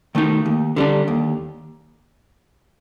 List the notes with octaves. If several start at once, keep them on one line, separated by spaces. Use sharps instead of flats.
D#3 A3 D#4
D#2
D3 G3 D4
D#2